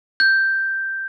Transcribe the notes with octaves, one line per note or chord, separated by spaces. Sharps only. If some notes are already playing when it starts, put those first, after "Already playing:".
G6